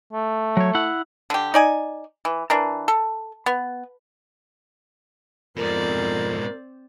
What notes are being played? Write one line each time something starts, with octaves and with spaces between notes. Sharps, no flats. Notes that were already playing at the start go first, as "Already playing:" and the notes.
A3
F#3 C#5
E4 F#5
D3 G4
D#4 D5 G#5
E3
E3 D4 A#4
A4
B3
F2 G#2 B2 C4 A#4 D5